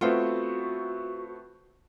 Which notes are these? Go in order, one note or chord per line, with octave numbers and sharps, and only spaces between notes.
A3 B3 C4 F4 F#4